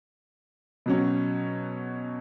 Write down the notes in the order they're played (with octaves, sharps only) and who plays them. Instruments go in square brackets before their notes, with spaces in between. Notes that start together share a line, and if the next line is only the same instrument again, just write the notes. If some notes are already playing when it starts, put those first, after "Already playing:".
[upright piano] B2 F#3 C#4